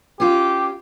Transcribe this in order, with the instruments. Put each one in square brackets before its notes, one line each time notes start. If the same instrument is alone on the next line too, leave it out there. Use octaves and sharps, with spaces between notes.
[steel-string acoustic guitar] C#4 F4 [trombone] G4